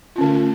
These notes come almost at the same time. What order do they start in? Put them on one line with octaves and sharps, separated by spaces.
F4 C#4 D3 A3